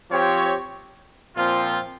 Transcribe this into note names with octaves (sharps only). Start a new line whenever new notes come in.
F3 C4 G4 C#5
A#2 F3 C4 F4